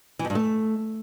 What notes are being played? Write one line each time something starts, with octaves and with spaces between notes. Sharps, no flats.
E3
F2
G2
A3